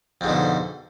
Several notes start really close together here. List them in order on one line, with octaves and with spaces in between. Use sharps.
F2 G#2 B2 D3